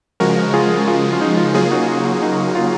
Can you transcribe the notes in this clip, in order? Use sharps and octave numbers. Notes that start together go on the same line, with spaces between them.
C#3 F3 G#3 F#4 A#4
F4 G#4
F4 G#4
F4
D#4
F4
C#3 F#3 A#3 F4 G#4
D#4 F#4
F4
F4
D#4
F4